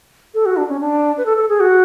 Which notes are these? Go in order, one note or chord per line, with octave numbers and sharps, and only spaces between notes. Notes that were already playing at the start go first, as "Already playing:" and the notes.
A4
F#4
D4
C#4
D4
B4
A4
A4
G#4
F#4